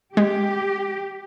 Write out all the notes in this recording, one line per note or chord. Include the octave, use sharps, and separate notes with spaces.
G#3 G4